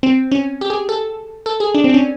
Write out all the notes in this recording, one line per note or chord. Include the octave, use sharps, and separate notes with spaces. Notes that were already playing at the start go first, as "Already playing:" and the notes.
C4
C#4
G4
G#4
A4
A4
G#4
D4
C4
D4
C#4